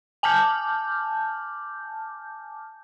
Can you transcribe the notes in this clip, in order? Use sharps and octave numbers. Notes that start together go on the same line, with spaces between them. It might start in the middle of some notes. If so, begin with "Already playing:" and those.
G#5 A5 D6 F6 G6